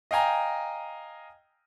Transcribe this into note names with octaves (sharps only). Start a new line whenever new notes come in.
D#5 F5 G5 G#5 A#5